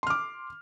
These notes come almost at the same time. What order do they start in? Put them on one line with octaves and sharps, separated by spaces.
C6 F6 D6